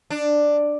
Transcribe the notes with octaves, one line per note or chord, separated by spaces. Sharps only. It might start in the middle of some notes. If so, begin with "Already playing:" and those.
D4